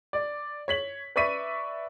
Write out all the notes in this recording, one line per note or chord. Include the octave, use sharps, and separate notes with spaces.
D5
C#5 B6 F#7
B4 D5 E5 C#6 B6 D#7